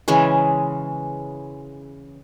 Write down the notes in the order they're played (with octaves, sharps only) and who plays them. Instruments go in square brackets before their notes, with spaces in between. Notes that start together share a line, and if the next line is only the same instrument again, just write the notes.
[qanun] C#3 E3 G#3 C#4